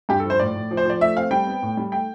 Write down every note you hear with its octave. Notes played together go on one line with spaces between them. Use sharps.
G2 G4
A4
F3
C5
A2 D5
A2
F3
C5
F3 D5
A3 E5
C4 F5
G3 G5
B3
A2
G3
A3 G5